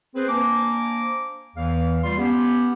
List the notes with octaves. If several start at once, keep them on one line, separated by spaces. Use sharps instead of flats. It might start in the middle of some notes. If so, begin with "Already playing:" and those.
C4 G#4 B4 C5
A#3 D4 C5 G#5 A#5 D6
E2 E3 F5
G3 A3 F4 C6
B3 C#4 G4